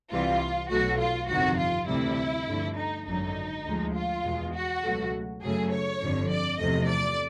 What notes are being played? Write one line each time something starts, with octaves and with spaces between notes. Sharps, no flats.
C2 C3 E3 G3 F4
B1 B2 F#3 A3 F#4
F4
G1 F2 C3 D#3 F#4
F4
D2 C3 E3 G3 E4
G2 D3 F3 A3
D#4
G#1 F#2 D3 F#3 D#4
D2 D3 F3 G#3
F4
E2 B2 G#3
F#4
C#2 B2 F#3 A3
F#2 C#3 F#3 A3 G#4
C#5
G1 F2 D3
D5
E2 C3 F3 A3 D#5
D5